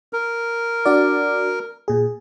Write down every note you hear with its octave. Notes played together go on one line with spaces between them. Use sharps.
A#4
D4 F#4 D5
A#2 G#4